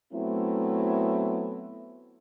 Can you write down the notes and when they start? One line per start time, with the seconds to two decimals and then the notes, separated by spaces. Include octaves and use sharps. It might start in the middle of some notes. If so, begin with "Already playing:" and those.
0.13 F#3 A3 B3 C4 E4